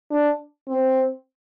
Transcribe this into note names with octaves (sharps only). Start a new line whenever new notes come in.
D4
C4